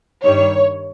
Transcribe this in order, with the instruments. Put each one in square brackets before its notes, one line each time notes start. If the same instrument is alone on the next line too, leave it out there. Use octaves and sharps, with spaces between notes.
[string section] G2 D#3 G3 C#5